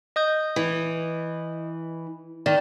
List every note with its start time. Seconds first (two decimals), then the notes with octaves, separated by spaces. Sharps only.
0.16 D#5 D#6 G6
0.56 E3
2.46 D#3 D5